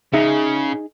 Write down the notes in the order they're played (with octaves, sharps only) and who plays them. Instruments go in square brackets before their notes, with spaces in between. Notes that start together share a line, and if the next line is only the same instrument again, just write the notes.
[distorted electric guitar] C#3 [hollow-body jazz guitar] D#4 G#4 E5